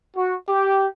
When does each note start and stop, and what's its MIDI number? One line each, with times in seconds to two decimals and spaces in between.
0.16 0.36 66
0.49 0.87 67